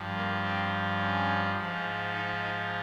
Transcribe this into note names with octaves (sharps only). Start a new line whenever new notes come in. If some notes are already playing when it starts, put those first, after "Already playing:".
Already playing: G2 F3
A#3
C4
C#4
G#2 F3
D#4
D#4